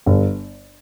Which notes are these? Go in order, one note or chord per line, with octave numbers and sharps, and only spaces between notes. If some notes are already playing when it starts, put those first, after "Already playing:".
G1